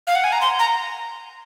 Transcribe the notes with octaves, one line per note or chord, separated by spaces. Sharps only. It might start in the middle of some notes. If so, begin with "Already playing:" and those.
F5
F#5
G#5
A#5
C6
A#5